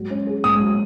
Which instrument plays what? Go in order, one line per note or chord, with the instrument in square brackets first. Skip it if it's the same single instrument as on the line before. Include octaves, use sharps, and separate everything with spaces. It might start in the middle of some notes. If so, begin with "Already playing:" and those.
Already playing: [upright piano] G#2 F#3
C#4
G#4
[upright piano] G#2 [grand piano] D#6
[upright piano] F#3